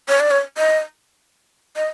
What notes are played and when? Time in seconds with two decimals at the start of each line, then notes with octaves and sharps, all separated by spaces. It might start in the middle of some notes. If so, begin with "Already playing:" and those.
0.08 C#5
0.20 D5
0.31 C#5
0.57 D#5
1.76 D#5